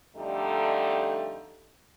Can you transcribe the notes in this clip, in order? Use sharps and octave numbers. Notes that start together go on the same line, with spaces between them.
F2 D3 G3 A3 D#4